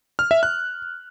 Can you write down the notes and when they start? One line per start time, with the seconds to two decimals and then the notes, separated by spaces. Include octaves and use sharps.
0.19 F6
0.31 E5
0.43 F#6